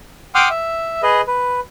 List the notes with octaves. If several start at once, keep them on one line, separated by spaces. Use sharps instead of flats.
F#5 G5 C6 D6 D#6 F6
E5
G#4 B4 D#5
B4